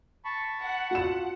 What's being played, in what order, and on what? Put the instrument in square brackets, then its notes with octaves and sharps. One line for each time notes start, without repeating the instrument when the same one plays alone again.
[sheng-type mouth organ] A5 B5 C#6
[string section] F#5
[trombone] F4 [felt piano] F#4 E7